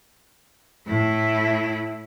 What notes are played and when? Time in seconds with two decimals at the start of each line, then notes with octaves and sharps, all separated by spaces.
0.87 A2 E4